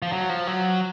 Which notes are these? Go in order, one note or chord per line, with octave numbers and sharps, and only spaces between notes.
F3
F#3
F3
F#3